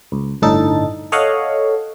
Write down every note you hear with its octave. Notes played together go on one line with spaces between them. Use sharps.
C#2
G1 A2 D3 D#4 A4 A6
A4 C#5 D#5 F5 F#5